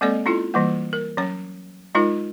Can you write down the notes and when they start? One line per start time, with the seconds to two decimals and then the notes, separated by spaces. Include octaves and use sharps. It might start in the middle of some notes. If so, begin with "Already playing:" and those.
0.01 G#3 A#3 C4 A4 D5 D#5
0.26 C#4 E4 F4 A4
0.54 E3 G3 A#3
0.93 A#4
1.17 F#3 C#4 C#5
1.95 G#3 D#4 F4 A#4